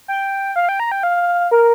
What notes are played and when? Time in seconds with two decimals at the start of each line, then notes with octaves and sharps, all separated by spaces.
0.08 G5
0.56 F5
0.69 G5
0.80 A#5
0.92 G5
1.03 F5
1.51 A#4